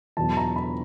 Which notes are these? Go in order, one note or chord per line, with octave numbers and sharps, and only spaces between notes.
E2 B2 F#3 A5
A#5
B5